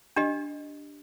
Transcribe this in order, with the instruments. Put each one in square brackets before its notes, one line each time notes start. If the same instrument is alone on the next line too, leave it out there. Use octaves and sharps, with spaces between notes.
[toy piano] D4 G4 D#5